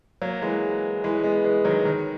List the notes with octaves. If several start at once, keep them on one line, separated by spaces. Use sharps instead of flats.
F#3 A#3
E3 G#3
E3 G#3
G#3 B3
E3 G#3
D#3 F#3
D#3